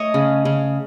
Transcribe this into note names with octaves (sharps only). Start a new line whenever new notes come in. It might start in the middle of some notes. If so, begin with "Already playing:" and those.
Already playing: A3 C#5 D#5
C#3
C#3